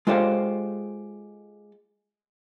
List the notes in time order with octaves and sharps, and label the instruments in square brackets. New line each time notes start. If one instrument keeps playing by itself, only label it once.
[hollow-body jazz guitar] G#3 F4 G4 A4 C5 F5